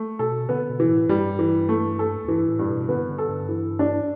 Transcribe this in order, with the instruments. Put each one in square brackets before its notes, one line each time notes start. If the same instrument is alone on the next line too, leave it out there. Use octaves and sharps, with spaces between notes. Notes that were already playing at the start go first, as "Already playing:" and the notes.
Already playing: [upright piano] A3
[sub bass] B2 [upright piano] A4
[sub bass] D3 [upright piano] B3
[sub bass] B2
[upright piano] E3
[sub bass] A2
[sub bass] G2 [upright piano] G3
[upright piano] E3
A3
A4
[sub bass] E2
[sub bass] G2 [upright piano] E3
[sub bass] A2
[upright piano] G2
[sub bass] B2
[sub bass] D3 [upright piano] B3
[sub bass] D3
[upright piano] A4
[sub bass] G2
[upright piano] E3
D4